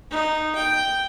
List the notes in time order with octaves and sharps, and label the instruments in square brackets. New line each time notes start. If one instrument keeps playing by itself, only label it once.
[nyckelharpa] D#4
G5